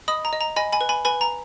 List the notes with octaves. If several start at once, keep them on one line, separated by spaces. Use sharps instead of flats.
D#5 B5 D#6
A#5
D#5
A#5
D#5 G#5 B5
G#5 B5
B4
G#5 B5
B4 G#5 B5
A#5